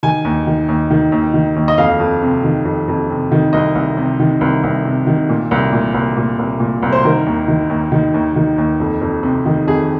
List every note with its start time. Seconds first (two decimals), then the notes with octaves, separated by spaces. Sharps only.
0.03 D#3 G#5
0.25 D#2
0.47 D#3
0.69 D#2
0.90 D#3
1.12 D#2
1.34 D#3
1.56 D#2
1.68 D#5
1.78 F2 F5
2.00 F2
2.22 C3
2.44 D#3
2.65 F2
2.88 F2
3.10 C3
3.32 D#3
3.53 C2 D#5
3.75 C2
3.97 C3
4.20 D#3
4.41 C2
4.64 C2
4.85 C3
5.07 D#3
5.29 A#2
5.51 C2
5.73 A#2
5.94 C2
6.17 A#2
6.39 C2
6.60 A#2
6.82 C2
6.93 C5
7.04 D#3 A#4
7.26 D#2
7.48 D#3
7.70 D#2
7.92 D#3
8.14 D#2
8.36 D#3
8.58 D#2
8.80 F2
9.01 F2
9.23 C3
9.46 D#3
9.67 F2 G#4